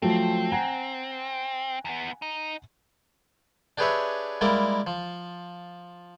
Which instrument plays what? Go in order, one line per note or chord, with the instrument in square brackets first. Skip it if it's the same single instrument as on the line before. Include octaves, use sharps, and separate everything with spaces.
[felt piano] F3 F#3 A3 [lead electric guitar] C4
[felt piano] F#5 G#5 A#5
[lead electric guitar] E2 B3
D#4
[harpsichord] D4 G4 G#4 B4 C#5 E5
G3 G#3 A#3 E4 A#4 D5
F3